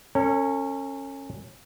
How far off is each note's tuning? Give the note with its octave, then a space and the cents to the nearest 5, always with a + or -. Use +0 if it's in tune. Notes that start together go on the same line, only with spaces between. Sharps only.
C#4 -15 A4 +45